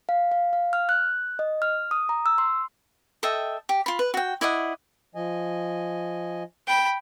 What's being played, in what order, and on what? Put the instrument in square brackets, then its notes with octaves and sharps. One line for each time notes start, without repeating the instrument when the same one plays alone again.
[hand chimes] F5
F5
F5
F6
F#6
D#5
F6
D#6
A#5
E6
C6
[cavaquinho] A4 D#5 E5 G5
G4
F4 B5
B4
F#4 G5
E4 D5 D#5 F#5
[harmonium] F3 D#5 G#5
[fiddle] G5 B5